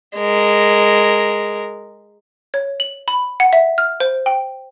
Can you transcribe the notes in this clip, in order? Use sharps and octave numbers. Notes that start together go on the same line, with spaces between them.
G#3 A#4
C#5
F#7
B5
F#5
E5
F6
C5
G5